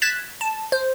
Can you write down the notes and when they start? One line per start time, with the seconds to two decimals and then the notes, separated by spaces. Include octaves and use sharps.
0.02 F#6 G#6 A6 B6 E7
0.41 A5
0.72 C5